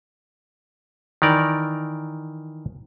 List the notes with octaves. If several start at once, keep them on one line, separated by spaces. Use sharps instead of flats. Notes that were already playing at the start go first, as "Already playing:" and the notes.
D#3 E3 A#4 D5